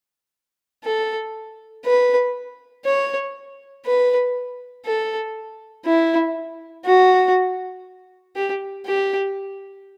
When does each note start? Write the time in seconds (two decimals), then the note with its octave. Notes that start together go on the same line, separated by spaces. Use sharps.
0.85 A4
1.86 B4
2.85 C#5
3.86 B4
4.86 A4
5.86 E4
6.86 F#4
8.36 G4
8.86 G4